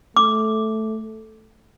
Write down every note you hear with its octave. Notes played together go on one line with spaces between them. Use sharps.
A3 D6